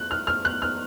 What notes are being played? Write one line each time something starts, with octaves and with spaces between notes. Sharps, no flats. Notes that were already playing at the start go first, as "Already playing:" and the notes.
Already playing: F#6
F6
F6
F#6
F6